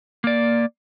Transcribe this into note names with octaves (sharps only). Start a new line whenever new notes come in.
A#3 D5